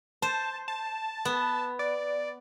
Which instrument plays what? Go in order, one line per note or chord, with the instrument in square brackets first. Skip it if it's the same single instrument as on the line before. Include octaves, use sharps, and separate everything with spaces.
[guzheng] C5 [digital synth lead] A5
[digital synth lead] A5
[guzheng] B3
[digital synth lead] D5